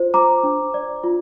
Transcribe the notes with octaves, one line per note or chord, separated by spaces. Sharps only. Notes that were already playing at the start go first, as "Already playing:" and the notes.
Already playing: F4 C5
C5 A#5 D6
D4
D5
F4